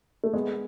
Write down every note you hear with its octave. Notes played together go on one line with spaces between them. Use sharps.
A3
G#3 B3